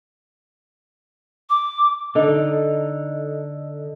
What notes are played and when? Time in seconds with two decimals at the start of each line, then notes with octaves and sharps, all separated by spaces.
1.50 D6
2.15 D3 D#4 A4 D#5